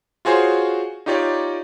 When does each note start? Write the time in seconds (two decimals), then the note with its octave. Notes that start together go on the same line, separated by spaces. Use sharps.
0.25 F4 F#4 G#4 C5 C#5
1.06 D#4 F4 G4 C#5 D5